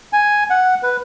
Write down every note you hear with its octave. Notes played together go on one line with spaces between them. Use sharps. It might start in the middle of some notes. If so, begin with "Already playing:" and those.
G#5
F#5
B4